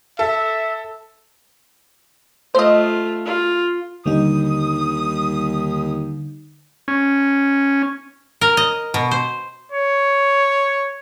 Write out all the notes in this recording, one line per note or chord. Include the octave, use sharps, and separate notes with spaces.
A4 E5
A3 F4 C5 D#5
F4
D#2 D3 G3 D#4 D#6
C#4
A#4
D#5
B2
C5
C#5